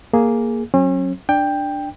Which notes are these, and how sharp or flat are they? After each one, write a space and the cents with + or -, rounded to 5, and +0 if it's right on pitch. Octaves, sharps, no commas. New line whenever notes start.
A#3 +0 G#4 +0
F#3 -5 C#4 -40
D4 +5 G5 +10